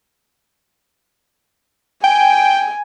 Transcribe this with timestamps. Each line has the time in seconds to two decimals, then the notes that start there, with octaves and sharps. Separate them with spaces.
2.04 G5 G#5